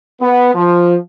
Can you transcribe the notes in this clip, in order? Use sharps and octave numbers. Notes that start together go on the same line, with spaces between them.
B3
F3